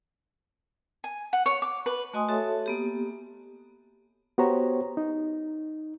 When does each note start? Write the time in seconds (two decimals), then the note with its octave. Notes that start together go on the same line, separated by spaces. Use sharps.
1.04 G#5
1.33 F#5
1.46 C#5
1.62 D6
1.86 B4
2.13 A3 F#4 D#5 G#5 C6 D#6
2.29 F#4 A4 C#5 E5 A5
2.66 A#3 B3 G4
4.38 B3 F#4 G4 C5 C#5 A#5
4.97 D#4